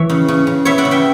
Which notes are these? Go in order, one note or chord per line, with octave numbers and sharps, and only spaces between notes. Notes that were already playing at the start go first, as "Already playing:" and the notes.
Already playing: E3 C#5 E5
C#3
C#3
C#3
B3 C#5 E5
D5 F#5
C#3
E5 G5